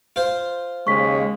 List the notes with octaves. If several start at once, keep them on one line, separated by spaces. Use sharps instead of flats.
F4 C5
D#2 C#3 G#3 C#6 B6